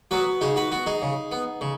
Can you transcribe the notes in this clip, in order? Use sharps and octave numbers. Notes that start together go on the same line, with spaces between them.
F#3 B3 F#4 B4
C#3 D#4 G#4
F#4 B4
B3 F#4
D#4 G#4
C#3
B3
C#3